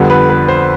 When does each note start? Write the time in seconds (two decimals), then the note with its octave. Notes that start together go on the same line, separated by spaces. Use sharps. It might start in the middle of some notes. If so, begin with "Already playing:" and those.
Already playing: F2 D3 G3 B3
0.10 B4
0.30 B4
0.48 C5